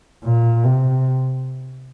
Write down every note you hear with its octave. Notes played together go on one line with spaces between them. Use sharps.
A#2
C3